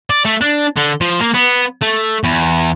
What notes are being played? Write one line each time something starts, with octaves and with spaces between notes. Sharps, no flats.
D5
A3
D4
D3
F3
A#3
B3
A3
E2